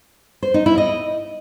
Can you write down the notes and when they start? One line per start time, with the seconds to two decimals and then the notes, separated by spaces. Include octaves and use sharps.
0.43 C5
0.54 D#4
0.66 E4
0.78 D#5